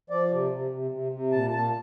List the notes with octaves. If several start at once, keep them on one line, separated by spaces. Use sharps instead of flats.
F3 D5
C3
C3
C3
C3
C3
A#2 A5
A#2 A5